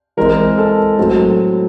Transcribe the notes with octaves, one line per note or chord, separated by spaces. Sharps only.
E3 G#3 C4 A#4
A4
A2 F#3 A3 C4